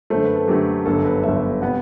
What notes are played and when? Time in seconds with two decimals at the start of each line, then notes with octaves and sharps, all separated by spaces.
0.10 F#2 D3 A3 C5
0.24 B4
0.36 A4
0.48 F#2 D3 A3 G4
0.86 G1 F#2 D3 A4
1.05 B4
1.23 G1 F#2 D3 E5
1.62 C3 G3 B3 F#5